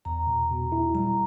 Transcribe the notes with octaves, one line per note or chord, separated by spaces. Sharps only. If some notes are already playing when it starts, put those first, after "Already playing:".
E2 A#5
B2
B2
E4
G3 A#5